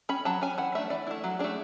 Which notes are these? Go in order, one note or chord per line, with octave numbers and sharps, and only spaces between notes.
C#4 B5
F#3 A5
C#4 G#5
E3 F#5
A3 D4 E5
E3 D5
A3 D4 E4
F#3 F#4
A3 D4 G#4